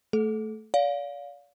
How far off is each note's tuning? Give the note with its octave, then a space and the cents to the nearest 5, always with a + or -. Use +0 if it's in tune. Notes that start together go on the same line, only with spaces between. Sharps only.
A3 +0 A4 -30
D5 -40 F5 +20